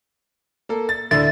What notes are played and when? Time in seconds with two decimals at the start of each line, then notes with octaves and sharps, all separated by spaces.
0.69 A#3 A4
0.89 A6
1.11 D2 D3 E4 A6